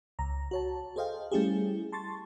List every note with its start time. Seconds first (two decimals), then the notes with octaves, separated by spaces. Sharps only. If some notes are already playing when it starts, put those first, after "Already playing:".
0.19 C#2 A#5
0.51 F#4 C#5 A5
0.96 G#4 A4 C5 D#5 F5 G5
1.31 G3 A3 C#4 E4 G4 G#4
1.92 A5 C6 C#6 A6